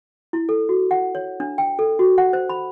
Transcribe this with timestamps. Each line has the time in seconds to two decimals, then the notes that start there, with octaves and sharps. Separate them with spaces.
0.33 E4
0.49 A4
0.69 F#4
0.91 F#5
1.15 C#5
1.40 D4
1.58 G5
1.79 A4
1.99 F#4
2.18 F#5
2.33 C5
2.49 B5